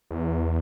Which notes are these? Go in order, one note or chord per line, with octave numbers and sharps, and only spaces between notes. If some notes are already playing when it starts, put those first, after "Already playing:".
E2